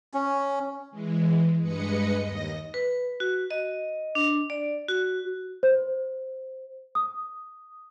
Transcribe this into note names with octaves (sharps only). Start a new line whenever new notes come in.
C#4
E3 G#3
G2 G#3 B4 D#5 C#7
D#2 D#5 A#6
B4
F#4
D#5
D4
D5
F#4
C5
D#6